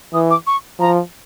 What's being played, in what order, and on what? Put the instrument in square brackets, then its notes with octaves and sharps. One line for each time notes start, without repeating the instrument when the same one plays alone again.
[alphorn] E3 [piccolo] D#6
[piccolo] D6
C#6
[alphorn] F3 [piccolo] A#5